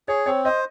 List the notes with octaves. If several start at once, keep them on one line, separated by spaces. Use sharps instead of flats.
G#4 C#5
C4 C#5
C5 D#5